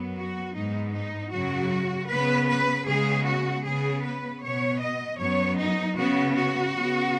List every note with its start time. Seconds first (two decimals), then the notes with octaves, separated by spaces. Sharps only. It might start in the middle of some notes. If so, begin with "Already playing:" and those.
Already playing: F#2 F#3 B3
0.16 F#4
0.55 G#2 G#3 B3 D#4
0.94 D#4
1.32 F#2 C#3 F#3 F#4
2.09 C#3 B3 B4
2.48 B4
2.87 C#3 G#3 B3 G#4
3.26 F#4
3.64 C#3 B3 G#4
4.03 B4
4.41 B2 B3 C#5
4.80 D#5
5.19 F#2 F#3 B3 C#5
5.58 D#4
5.96 C#3 B3 F#4
6.35 F#4
6.74 C#3 B3